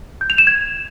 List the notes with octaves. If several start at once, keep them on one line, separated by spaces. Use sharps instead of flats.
G6
F7
E7
G#6